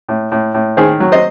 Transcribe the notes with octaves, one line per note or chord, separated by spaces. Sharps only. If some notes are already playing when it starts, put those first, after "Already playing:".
A2
A2
A2
D#3 G#4 C5
F#3
C5 D#5